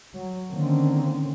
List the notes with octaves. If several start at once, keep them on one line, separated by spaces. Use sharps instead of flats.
F#3
D3 D#3 A#3 C4 C#4